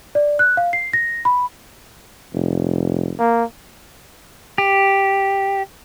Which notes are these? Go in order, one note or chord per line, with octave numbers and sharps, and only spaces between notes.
D5
F#6
F5
C7
A#6
B5
F1
A#3
G4